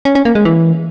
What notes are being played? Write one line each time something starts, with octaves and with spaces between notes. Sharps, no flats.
C#4
C#4
A#3
G#3
E3